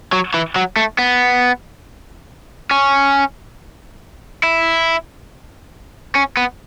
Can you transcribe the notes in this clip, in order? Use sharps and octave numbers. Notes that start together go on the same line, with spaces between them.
F#3
E3
F#3
A3
B3
C#4
E4
C#4
B3